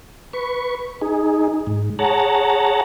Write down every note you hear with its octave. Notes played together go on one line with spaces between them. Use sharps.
B4 C#6
D#4 G#4
G#2
G#4 C#5 F#5 A5 A#5